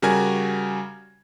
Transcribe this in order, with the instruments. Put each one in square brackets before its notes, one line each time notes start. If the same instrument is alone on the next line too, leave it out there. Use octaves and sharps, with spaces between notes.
[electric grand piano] C#3 G3 F#4 A#4 G#5 G#6